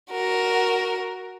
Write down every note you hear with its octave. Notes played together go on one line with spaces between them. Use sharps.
F#4 A#4